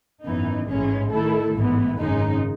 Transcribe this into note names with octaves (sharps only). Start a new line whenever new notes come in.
G#1 F#2 E3 B3 D#4
A1 G#2 E3 G#3 C#4
D#3 A3 E4 A4
A1 G#2 E3 B3
G#1 F#2 C#3 G#3 D#4